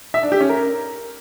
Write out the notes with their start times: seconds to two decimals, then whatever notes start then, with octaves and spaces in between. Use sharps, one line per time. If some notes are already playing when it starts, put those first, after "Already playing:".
0.14 E5
0.23 D4
0.32 G4
0.41 C#4
0.49 A#4